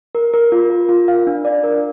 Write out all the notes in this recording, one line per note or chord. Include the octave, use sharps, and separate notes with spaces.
A#4
A#4
F4
A#4
F4
F5
D4
D5
A#4